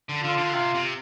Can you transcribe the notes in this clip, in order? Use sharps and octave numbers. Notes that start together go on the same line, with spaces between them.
D3
D3 F4
D3
C3 F4
C3